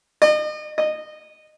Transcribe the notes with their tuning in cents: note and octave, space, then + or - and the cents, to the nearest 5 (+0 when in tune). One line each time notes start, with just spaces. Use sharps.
D#5 -40
D#5 -20